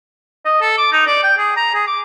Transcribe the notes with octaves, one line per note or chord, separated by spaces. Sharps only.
D#5
A4
D6
D#4
D5
G5
G#4
A#5
G#4
D6